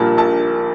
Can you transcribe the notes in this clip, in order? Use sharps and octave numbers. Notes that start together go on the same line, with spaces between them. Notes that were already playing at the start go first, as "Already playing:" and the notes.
Already playing: A#1 A#2 G3 A#3 D4 A5
A#1 A5